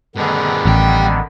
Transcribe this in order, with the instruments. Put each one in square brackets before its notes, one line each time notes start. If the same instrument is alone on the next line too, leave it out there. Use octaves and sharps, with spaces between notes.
[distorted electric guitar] G2 G#4 [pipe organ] D3 D#3 B3
[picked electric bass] A1 [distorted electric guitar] G3 G5